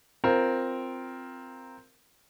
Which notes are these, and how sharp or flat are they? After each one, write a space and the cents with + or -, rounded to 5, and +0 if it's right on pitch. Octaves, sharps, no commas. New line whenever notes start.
C4 +0 F4 +0 A#4 +0